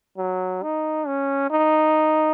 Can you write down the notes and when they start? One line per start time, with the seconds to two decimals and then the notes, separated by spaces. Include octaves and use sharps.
0.18 F#3
0.63 D#4
1.07 C#4
1.50 D#4